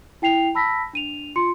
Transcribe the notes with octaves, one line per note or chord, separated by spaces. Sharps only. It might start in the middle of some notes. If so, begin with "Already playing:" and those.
E4 G5 C7 F7
A5 B5 E6 A#6 B6
D4 D#7 F7
F4 C6 C#7